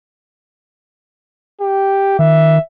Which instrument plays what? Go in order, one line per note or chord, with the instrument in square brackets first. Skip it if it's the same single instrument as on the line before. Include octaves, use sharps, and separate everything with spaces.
[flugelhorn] G4
[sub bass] D#3 [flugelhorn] E5